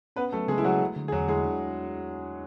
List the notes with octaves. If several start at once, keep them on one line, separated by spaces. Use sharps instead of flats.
B3 C#4 B4
F#3 A3 A4
C#3 G#3 G#4
E4
F#3 F#4 G#4
A3
D3
G#4
E2 F#3 F#4
G#3 E4 G#4
D4